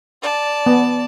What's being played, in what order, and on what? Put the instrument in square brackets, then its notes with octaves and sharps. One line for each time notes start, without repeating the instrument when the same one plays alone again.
[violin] D5 A5
[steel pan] B3